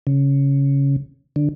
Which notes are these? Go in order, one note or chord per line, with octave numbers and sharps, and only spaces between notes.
C#3
D3